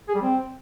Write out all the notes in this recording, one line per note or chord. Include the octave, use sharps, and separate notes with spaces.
G#4
G3
C4